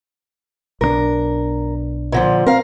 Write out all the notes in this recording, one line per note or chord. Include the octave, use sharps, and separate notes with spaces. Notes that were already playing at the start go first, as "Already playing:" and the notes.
B1 D#3 D4 A#4
A#2 D3 F3
C4 A#4 F5